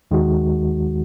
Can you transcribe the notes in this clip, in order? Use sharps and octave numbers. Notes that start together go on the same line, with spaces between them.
D#2 D#3 G#3 F#4